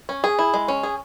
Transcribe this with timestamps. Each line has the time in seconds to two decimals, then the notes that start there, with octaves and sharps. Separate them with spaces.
0.09 C#4
0.24 G#4
0.39 E4
0.54 G#3
0.68 C#4
0.83 G#4